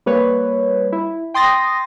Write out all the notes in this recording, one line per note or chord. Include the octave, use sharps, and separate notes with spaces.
G3 A#3 B4 C#5
E4
G5 C6 D#6 A6 A#6